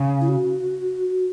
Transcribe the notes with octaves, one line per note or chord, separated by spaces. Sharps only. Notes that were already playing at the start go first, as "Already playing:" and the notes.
Already playing: C#3
E4
F#4